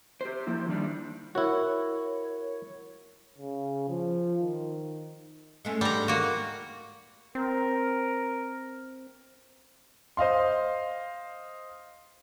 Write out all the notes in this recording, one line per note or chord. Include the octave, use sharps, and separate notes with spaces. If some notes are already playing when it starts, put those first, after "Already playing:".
G4 C5
F3 A#3 E4
D#3 G3 D4
E4 F#4 A#4 C#5
C#3
F3
D#3
G#3 A3 C#4
G#2 G3 B3 D4 A#5
A#3 F#4
C4 A#4
C5 D#5 F5 C6